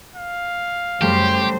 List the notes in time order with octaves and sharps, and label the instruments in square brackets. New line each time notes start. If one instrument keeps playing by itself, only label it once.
[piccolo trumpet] F5
[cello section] F#2 C#3 C5 [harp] G3 A3 [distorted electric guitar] G4